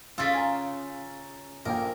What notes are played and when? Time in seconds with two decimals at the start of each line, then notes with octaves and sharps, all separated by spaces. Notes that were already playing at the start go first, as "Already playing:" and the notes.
0.18 C#3 F4 E6 A6 B6
0.34 G#5 A#5
1.65 A#1 A#3 A#4 G5